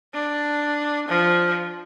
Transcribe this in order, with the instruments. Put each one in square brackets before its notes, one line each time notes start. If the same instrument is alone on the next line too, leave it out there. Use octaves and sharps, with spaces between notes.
[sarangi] D4
F3